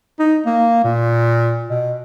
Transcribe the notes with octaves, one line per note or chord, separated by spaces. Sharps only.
D#4
A#3
A#2
B2